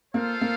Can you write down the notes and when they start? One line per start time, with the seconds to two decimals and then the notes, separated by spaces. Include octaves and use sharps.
0.14 A#3 F4 A4 C5 F5
0.41 A#3